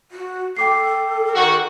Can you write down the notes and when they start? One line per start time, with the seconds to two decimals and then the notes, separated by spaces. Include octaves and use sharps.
0.11 F#4
0.57 A4 G5 D6 C7
1.35 D#3 F#4